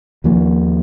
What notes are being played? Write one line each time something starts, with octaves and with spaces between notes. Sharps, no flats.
D#2 F3 A#3